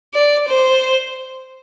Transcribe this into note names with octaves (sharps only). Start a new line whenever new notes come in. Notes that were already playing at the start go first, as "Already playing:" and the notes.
D5
C5